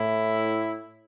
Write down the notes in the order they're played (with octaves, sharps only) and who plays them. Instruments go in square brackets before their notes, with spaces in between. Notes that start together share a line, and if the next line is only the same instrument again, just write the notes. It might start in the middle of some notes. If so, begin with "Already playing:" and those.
Already playing: [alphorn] A2 [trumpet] E4